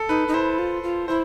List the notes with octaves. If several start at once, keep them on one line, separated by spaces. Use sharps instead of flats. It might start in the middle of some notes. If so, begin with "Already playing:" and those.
Already playing: A4
D#4 B4
D#4
E4 C5
F4
F4
E4 C5